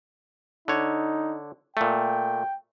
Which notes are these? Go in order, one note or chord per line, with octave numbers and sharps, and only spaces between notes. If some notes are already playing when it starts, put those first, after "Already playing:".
D3 D#4 C#5
A#2 A3 G5